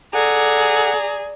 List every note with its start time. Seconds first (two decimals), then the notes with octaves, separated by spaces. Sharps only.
0.14 G#4 A4 D5 F#5 A#5